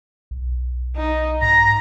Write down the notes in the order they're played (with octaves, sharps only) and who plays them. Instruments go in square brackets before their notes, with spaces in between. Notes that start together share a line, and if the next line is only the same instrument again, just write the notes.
[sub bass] B1
[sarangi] D#4
[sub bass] G#2 [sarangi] A#5 [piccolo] A#6